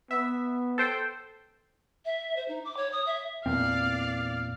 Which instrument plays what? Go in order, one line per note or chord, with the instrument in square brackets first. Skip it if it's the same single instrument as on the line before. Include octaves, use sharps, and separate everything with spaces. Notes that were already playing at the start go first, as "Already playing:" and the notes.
[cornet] B3 [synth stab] E5
[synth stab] A4 C5 G5
[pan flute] E5
C5
D#4
D6
C#5
D#6
E5
[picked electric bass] E2 A#2 C4 [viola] D5 F5